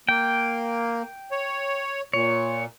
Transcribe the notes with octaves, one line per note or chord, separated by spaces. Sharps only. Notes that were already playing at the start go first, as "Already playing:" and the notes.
A#3 G5
C#5
A#2 C#5